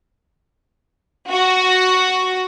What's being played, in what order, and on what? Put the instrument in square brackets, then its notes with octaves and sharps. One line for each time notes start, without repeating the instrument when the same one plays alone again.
[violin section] F#4